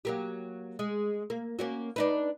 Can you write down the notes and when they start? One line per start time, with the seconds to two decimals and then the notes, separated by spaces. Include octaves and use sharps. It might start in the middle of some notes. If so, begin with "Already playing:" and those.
0.05 F#3 A#3 G4
0.79 G#3
1.30 A#3
1.59 A#3 C#4 F#4
1.96 D4 D#4 B4